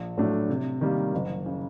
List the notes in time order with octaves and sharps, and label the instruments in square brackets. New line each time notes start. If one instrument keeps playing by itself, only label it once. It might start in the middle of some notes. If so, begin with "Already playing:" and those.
Already playing: [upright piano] A#1
A2 F#3 A3 D4
C3
D#3 G3 A#3
F#1
C#3